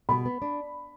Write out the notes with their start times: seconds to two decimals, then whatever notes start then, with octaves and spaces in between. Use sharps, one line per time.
0.09 B2 B5
0.26 B3
0.42 D4